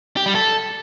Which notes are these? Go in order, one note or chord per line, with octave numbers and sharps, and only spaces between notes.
G4
G3
A4